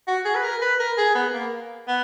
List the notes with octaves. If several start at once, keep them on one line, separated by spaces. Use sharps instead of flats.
F#4
G#4
B4
A#4
B4
A#4
G#4
B3
A#3
B3